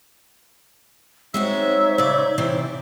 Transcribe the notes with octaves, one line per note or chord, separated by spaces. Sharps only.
G#3 C4 D#4 F#4 C5 C#5 E5
C#3 D5
C3 E3 C4